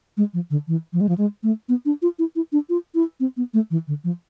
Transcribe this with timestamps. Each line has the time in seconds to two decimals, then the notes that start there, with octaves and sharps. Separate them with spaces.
0.17 G#3
0.34 F3
0.50 D3
0.68 E3
0.93 F3
1.01 G#3
1.09 F3
1.18 G#3
1.43 A3
1.69 B3
1.85 D4
2.02 F4
2.19 E4
2.36 E4
2.52 D4
2.69 F4
2.95 E4
3.20 C4
3.37 B3
3.54 A3
3.71 E3
3.88 D3
4.04 F3